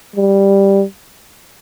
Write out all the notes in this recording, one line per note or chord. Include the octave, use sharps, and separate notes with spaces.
G3